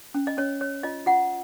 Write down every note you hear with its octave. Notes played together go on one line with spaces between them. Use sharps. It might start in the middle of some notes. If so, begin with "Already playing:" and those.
C#4
D#5
C#4 C#5
C#5
F4 D#5
F4 F#5